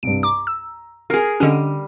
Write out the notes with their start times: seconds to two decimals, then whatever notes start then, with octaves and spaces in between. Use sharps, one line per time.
0.03 C2 G2 D7
0.23 A#5 D6
0.47 E6
1.10 G#4 A#4 F6 C7
1.40 D3 G3 C#4 D4 D#5 D#7